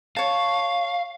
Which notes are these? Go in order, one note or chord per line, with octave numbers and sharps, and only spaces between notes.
C#5 F5 A5